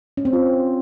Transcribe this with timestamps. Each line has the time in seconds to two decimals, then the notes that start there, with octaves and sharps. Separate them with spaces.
0.17 C#4
0.25 C4
0.33 F4